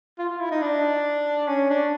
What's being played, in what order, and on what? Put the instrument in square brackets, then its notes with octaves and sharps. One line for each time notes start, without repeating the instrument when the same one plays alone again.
[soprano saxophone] F4
F4
E4
D#4
D4
C#4
D4